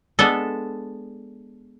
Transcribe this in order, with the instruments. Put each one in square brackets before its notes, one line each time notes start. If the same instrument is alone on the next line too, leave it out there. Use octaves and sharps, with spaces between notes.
[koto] G#3 B3 D4 A4